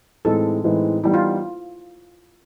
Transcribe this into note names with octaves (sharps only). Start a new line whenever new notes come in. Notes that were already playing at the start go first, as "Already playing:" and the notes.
A2 E3 G#3 C4 D#4 A4
A2 E3 G#3 C4 D#4
E3 G3 B3 D#4 E4
F4